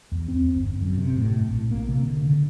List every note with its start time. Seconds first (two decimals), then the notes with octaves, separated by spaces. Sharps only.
0.12 E2
0.28 C4
0.54 G1
0.81 F#2
0.98 C3
1.18 A2
1.51 A#1
1.71 A#3
1.89 C3
2.03 D3
2.27 D3